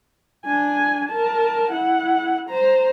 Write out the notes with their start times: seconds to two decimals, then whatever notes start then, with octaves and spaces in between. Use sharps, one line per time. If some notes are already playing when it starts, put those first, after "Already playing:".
0.46 D4 G#5
1.09 A#4 A5
1.72 E4 F#5
2.49 C5 A#5